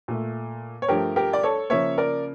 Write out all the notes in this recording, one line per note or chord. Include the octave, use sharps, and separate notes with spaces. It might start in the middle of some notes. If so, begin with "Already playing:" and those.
A#2 A3
C#5
G2 F3 A3 G4 A#4
G4 A#4
D5
A4 C#5
C#3 F3 A#3 C#5 E5
A#4 D5